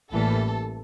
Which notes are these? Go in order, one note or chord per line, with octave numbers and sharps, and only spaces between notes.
A1 A2 E3 G3 A#3 A4